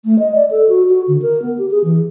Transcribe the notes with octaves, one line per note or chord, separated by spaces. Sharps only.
A3
D#5
D5
A4
F#4
F#4
D3
A#4
B3
G4
G#4
E3